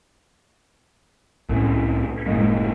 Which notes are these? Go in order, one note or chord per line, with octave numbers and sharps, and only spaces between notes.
C2 A2 C#4
F#1 A2 G#3 A#3